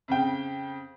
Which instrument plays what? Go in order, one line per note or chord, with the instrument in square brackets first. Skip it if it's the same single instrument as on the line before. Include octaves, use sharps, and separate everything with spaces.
[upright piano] F2 C#3 G5